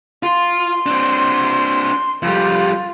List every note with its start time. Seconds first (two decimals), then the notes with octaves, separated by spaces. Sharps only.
0.23 F4 C6
0.86 C4 D4
2.23 F2 G3 F4